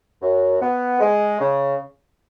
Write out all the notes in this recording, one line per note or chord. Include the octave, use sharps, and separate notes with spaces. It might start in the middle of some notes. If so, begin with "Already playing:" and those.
F#2
B3
G#3
C#3